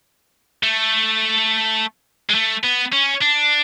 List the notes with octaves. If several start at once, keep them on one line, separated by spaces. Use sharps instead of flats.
A3
G#3
A3
B3
C#4
D4